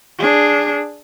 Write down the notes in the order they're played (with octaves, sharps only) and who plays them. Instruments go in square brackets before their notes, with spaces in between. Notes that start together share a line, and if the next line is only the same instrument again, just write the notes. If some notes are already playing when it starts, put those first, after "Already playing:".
[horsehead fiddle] D4 G#4